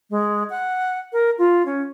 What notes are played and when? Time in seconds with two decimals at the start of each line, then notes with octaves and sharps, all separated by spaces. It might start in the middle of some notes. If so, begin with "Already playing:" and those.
0.11 G#3
0.50 F#5
1.13 A#4
1.38 F4
1.66 C#4